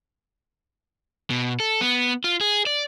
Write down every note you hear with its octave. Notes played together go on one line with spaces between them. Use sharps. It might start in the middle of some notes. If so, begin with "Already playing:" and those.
B2
A4
B3
F4
G#4
D5